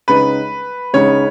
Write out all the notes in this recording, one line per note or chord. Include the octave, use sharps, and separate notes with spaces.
C#2 C#3 G#3 D#4 B4
C#2 C#3 G#3 D#4 C#5